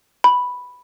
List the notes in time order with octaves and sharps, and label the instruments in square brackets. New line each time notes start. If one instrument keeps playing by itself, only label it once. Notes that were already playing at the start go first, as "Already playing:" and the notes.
[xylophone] B5